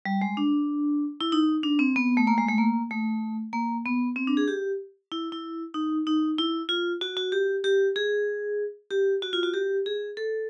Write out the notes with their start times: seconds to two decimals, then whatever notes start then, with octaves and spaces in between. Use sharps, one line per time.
0.05 G3
0.22 G#3
0.37 D4
1.21 E4
1.32 D#4
1.63 D4
1.79 C4
1.96 B3
2.17 A3
2.27 A#3
2.38 G#3
2.48 A3
2.58 A#3
2.91 A3
3.53 A#3
3.86 B3
4.16 C4
4.27 D4
4.37 G#4
4.48 G4
5.12 E4
5.32 E4
5.74 D#4
6.07 D#4
6.38 E4
6.69 F4
7.01 F#4
7.17 F#4
7.32 G4
7.64 G4
7.96 G#4
8.91 G4
9.22 F#4
9.33 F4
9.43 F#4
9.54 G4
9.86 G#4
10.17 A4